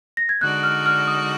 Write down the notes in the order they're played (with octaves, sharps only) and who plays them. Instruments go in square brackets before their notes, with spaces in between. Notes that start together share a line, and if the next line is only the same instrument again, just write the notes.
[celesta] A#6
G#6
[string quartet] D3 G#3 D#4 F#4 D5 [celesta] F#6
[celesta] F6
F6
D#6